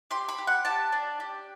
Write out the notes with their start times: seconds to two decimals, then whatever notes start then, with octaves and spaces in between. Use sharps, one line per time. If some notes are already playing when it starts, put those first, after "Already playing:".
0.11 G4 C6
0.28 B5
0.38 G4
0.47 F#5
0.65 G4 A5
0.92 D4
1.20 G4